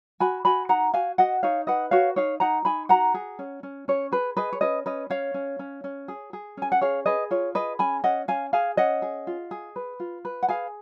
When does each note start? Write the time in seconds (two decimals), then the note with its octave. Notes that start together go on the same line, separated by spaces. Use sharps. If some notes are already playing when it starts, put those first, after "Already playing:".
0.20 F#4 G#5 B5
0.45 F#4 G#5 B5
0.69 D#4 F#5 A#5
0.94 F#4 F5 G#5
1.18 F#4 D#5 F#5
1.43 D#4 C#5 F5
1.67 B4 D#5 F#5
1.91 F#4 C#5 F5
2.16 D#4 C#5 F5
2.40 D#4 F#5 A#5
2.65 D#4 G#5 B5
2.89 F#4 F#5 A#5
3.14 G#4
3.39 C#4
3.63 C#4
3.88 C#4 C#5
4.12 G#4 B4
4.37 G#4 B4 D#5
4.53 C#5
4.61 C#4 B4 D#5
4.86 C#4 B4 D#5
5.10 C#4 C#5 F5
5.34 C#4
5.59 C#4
5.84 C#4
6.08 G#4
6.33 G#4
6.57 C#4 G#5
6.72 F#5
6.81 G#4 C#5 F5
7.06 G#4 B4 D#5
7.31 F4 C#5
7.55 G#4 B4 D#5
7.79 C#4 G#5 B5
8.04 C#4 D#5 F#5
8.28 C#4 F5 G#5
8.53 G#4 F5 G#5
8.77 C#4 D#5 F#5
9.02 G#4
9.27 F4
9.51 G#4
9.76 B4
10.00 F4
10.25 B4
10.43 F#5
10.48 G#4 F5 G#5